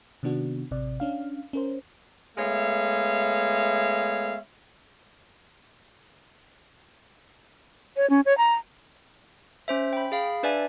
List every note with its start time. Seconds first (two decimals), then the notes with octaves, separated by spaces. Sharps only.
0.23 C3 D#3 B3 D4 F#4
0.71 A1 C3 D5
1.00 C#4 D4 F5
1.53 C#4 A#4 C5
2.38 G#3 A3 B3 C#5 E5 F5
7.97 C#5
8.10 C#4
8.26 C#5
8.38 A#5
9.68 C#4 C5 E5
9.93 G5 B5
10.12 G#4 F5 B5
10.43 D4 B4 D5 E5 G#5